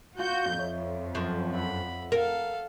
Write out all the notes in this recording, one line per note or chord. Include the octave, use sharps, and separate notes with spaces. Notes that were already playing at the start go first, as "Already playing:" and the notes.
F4 F#4 C6 D6 G6
F2 C#5 D#5 E5
F#2 F3
F#5 B5 E6
A4 A#4 F5